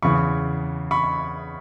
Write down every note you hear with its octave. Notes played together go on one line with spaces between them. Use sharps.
E2 C#3 E3 B5 C#6
B5 C#6